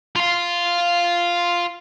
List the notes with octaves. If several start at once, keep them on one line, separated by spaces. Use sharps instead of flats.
F4 F5